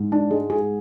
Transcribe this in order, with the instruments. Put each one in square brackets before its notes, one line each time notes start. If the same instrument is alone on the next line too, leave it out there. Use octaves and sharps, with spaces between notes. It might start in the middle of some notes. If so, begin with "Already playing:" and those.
Already playing: [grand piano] G#2
[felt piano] D4
G#3
G#4